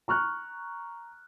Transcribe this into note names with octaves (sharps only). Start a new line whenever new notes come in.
A#5 C#6 F6 F#6